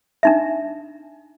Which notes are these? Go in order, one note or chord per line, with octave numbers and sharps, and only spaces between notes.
D4 D#4 E5